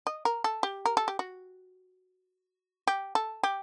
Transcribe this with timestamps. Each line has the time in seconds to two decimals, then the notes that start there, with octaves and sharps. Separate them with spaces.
0.07 D#5
0.25 A#4
0.44 A4
0.63 G4
0.85 A#4
0.97 A4
1.08 G4
1.19 F#4
2.87 G4
3.15 A4
3.43 G4